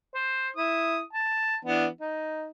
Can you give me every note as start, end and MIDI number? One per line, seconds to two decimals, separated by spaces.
0.15 0.48 72
0.57 1.00 64
0.57 1.00 87
1.13 1.56 81
1.65 1.87 52
1.65 1.87 59
1.65 1.87 62
2.01 2.47 63